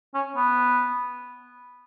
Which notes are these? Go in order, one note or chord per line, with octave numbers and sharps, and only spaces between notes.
C#4
B3